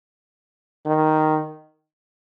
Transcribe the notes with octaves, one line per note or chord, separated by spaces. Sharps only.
D#3